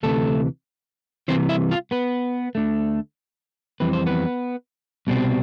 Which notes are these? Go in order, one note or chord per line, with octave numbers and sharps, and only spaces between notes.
D2 C3 E3 A3 A4
C2 C3 E3 C4 C5
E4 E5
F4 F5
B3 B4
D2 D3 A3
F2 E3 G3 C4 B4
C5
B3 B4
C2 B2 G3 C4